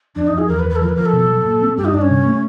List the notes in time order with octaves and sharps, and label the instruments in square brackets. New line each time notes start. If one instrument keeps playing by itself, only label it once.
[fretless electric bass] F2 [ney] D4
[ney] D#4
[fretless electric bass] F2
[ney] G#4
[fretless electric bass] E2 [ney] A#4
[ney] B4
[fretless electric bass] E2
[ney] B4
A4
[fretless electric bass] F3 [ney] A#4
[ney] B4
[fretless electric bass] F3 [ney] A#4
[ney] A4
[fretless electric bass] B2
F#3
A#2
C4
[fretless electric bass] G2 [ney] G4
[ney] D#4
[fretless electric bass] G2 [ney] D4
[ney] C#4
[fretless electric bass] C3
A3